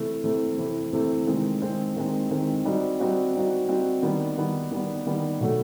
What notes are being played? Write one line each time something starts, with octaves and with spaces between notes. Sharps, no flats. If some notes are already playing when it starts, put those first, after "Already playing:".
Already playing: C3 E3 A3
C3 E3 A3
C3 E3 A3
C3 E3 A3
D#3 G#3 C4
D#3 G#3 C4
D#3 G#3 C4
D#3 G#3 C4
G3 C4 D#4 F#4
G3 C4 D#4 F#4
G3 C4 D#4 F#4
G3 C4 D#4 F#4
D#3 G3 B3
D#3 G3 B3
D#3 G3 B3
D#3 G3 B3
B2 F#3 A3